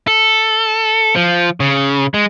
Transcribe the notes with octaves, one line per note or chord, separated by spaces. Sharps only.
A4
F3
C#3
G#3